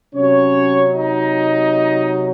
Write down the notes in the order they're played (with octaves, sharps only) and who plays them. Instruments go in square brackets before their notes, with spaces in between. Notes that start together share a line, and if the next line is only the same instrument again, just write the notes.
[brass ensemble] C3 F#3 C#4 C#5
D#4 D#5